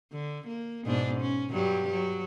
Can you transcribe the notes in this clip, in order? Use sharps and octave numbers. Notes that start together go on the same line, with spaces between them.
D3
A#3
G#2 B2 D4
C#4
G2 F#3 G4
F#3